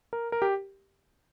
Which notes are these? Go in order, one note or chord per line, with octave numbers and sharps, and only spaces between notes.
A#4
A#4
G4